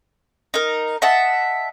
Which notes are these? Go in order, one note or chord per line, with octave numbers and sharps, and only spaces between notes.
D#4 A#4
D#5 E5 F#5 A5